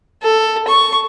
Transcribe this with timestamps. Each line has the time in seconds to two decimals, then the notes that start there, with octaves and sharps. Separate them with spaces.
0.22 A4
0.68 C#6